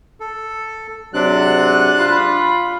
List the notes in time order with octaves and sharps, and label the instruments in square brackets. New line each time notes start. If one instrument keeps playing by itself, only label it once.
[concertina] A4
[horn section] G#2 C3 F#3 [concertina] D4 F#6
[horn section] F4 B5